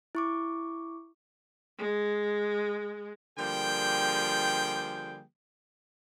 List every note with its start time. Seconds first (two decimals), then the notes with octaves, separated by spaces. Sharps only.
0.15 E4 C#6 D6
1.79 G#3
3.38 D3 F3 G3 A#3 G#4 G5